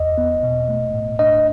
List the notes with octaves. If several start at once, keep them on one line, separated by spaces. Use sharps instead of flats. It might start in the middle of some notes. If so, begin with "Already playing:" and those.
Already playing: E2 D#5
B3
B2
A3
A2
D4 D#5